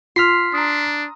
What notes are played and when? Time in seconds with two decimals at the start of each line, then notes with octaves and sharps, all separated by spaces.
0.16 F4 C6 F6 B6 C7
0.53 D4 A#5 D#6